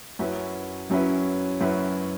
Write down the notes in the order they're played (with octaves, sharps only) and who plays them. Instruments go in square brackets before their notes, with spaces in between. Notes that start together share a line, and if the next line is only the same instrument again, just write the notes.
[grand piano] F#2 F#3 C#4 E4 B4
F#2 F#3 C#4 E4 B4
F#2 F#3 C#4 E4 B4